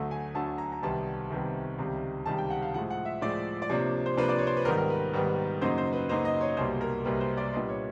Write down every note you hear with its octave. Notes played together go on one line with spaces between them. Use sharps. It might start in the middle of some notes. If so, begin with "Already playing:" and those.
Already playing: D2 D3 F#3 A3
G#5
D2 D3 F#3 A3 A5
A#5
A#5
C2 C3 D#3 G3 B3 A5
C2 C3 D#3 G3 B3
C#2 C3 D#3 G3
C#2 C3 D#3 G3 A5
G5
F#5
F5
A2 F3 G#3 F#5
F#5
E5
A2 F3 G#3 D5
D5
C3 F3 A#3 D4 C#5
C5
C3 F3 A#3 D4 B4
D5
C#5
C5
B4
G#2 D#3 G3 B3 A#4
A#4
B4
G#2 D#3 G3 B3
F#2 C#3 F#3 A#3 D#4 C5
C5
B4
F#2 C#3 F#3 A#3 D#4 C5
D#5
C#5
C2 B2 G3 A#3 C5
A#4
C2 B2 G3 A#3 B4
C5
D5
A#2 G3 B3 D4 D#5
C#5